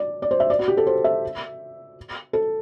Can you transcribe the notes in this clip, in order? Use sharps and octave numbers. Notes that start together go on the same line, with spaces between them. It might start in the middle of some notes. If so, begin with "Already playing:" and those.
Already playing: D5
D5
C5
E5
D5
F#4
G4
A4
C5
E5
A4